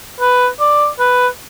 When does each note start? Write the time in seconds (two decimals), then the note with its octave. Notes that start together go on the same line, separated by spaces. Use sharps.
0.20 B4
0.60 D5
1.00 B4